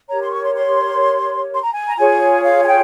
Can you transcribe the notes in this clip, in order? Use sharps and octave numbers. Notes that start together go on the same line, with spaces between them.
G4 A#4 C#5 A#5
C6
C#6
C6
C6
C6
A#5
G#5
A#5
F4 G#4 C#5 G#5
F5
G#5
G5